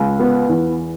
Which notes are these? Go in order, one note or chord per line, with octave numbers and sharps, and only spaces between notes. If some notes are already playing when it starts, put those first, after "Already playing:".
Already playing: C#2
B3
E2